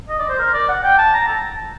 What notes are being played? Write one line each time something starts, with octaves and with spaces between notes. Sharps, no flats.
D#5
D5
C5
A#4
D5
F#5
G5
A5
A#5
A5